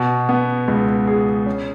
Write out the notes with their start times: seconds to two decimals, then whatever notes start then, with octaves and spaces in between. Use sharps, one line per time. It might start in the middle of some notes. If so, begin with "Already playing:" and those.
Already playing: B2
0.29 B3
0.68 C#2
1.07 G#4
1.46 C#4